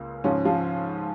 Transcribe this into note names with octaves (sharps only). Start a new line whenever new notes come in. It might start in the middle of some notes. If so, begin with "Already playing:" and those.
Already playing: C#2 C#3 A#3
G#2 C#3 F3 C#4
F3 F4